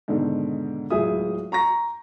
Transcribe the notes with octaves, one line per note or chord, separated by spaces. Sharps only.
G#2 B2 D3 D#3
D1 C#2 G#4 E5 D#6
A#5 C#6 A#6